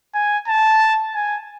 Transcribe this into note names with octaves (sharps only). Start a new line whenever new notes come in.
G#5
A5
G#5